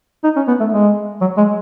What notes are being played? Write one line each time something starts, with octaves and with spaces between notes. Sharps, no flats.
D#4
C#4
B3
A3
G#3
F#3
G#3